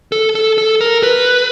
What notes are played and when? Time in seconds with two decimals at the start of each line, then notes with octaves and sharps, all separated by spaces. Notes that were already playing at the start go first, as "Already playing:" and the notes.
0.12 A4
0.35 A4
0.58 A4
0.81 A#4
1.03 B4